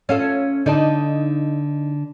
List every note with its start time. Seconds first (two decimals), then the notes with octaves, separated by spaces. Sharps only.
0.09 C#4 F4 A4
0.66 D3 D#4 D5 A5